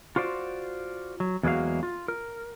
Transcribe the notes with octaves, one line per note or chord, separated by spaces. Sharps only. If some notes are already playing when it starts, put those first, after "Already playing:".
F4 F#4 C5 D5
F#3
E2 F#3 G#3 A#3 F#4 F5
F4
A#4